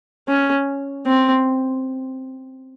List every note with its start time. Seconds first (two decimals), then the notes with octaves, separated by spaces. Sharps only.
0.29 C#4
1.07 C4